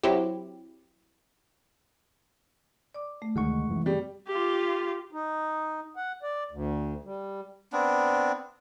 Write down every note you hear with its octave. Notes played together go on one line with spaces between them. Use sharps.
F#3 C4 E4 G4
D5 D6
A3
D2 C3 D#3 G#3 F#5 C#6
F#2 E3
G3
F4 G4
D#4
F#5
D5
D2
G3
B3 C4 D4